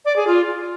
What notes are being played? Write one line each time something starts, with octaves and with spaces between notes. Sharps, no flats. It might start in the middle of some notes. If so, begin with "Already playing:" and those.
D5
G#4
F4